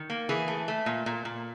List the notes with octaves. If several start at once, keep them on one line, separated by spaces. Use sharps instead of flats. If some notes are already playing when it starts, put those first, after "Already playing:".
Already playing: D#3
A#3
E3 G#4
A3
A3
A#2
A#2
A#2